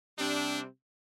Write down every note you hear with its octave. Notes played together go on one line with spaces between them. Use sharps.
C3 G3 C4 D4